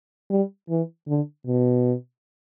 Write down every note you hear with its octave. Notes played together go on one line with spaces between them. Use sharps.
G3
E3
D3
B2